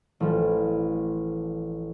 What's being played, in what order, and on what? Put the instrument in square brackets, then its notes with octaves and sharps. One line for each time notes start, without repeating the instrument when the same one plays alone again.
[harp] A1 F3